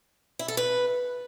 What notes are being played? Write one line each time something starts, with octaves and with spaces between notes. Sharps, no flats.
E4
A4
B4